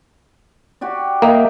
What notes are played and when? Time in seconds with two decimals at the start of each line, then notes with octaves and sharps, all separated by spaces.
0.81 F#4 G4 D5
1.22 A#3 D#5 E5 G5